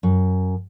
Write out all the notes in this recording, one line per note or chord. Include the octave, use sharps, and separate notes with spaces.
F#2